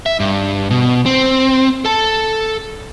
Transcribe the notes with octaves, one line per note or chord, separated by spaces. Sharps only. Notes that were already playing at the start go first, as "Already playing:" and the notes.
E5
G2
B2
C4
A4 A5